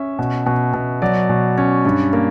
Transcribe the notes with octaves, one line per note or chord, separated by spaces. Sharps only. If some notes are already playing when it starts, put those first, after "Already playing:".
Already playing: C#4 E5
B2
B2
B2
F#3 D5
B2
C#4
G2
A#3